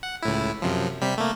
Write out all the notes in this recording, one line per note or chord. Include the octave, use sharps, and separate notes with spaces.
F#5
C#2 A2 E4
F#2 C3 F3
C3 G3 B6
A3 A#3